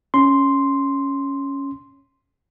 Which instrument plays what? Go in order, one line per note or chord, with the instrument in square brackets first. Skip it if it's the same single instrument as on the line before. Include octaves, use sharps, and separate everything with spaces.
[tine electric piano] C#4 C6